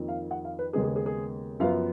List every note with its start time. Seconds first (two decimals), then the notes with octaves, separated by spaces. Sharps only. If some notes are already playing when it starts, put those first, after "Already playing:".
Already playing: F2 D#3 A#3
0.08 F5
0.31 F#5
0.45 F5
0.59 B4
0.73 D#2 C#3 G#3 B3 G#4
0.84 G#4
0.96 G#4
1.06 G#4
1.60 F#2 F3 B3 F5